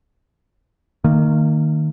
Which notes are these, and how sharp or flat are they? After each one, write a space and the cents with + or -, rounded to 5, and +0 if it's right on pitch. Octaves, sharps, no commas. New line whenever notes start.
D#3 -15 A#3 -35